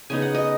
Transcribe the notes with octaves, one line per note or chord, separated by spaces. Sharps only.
C#3 B3 D#4 G#5
F#5
D#5